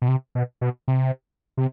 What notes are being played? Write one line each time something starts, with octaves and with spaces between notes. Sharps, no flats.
B2
C3
B2
B2
C3
C3